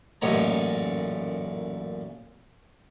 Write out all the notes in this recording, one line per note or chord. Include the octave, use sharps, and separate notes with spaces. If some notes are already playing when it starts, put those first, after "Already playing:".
A1 F#2 A#2 D#4 C#5 A#5